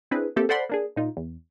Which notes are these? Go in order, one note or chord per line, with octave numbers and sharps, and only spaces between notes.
C4 D4 E4 G#4 B4
A3 A#3 C4 G4 A4
A4 C5 D5 F#5 B5 C6
A#3 D4 G#4
A#2 D#4 F4
E2